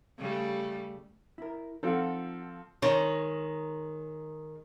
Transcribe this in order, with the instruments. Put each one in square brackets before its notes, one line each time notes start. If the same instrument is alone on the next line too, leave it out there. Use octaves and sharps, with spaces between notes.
[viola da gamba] C#3 G3 A3
[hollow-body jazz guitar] E4 A#4
[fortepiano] F3 C4 A4 [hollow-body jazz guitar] D#4 F4 F#5
[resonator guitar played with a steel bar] D#3 G#3 C#5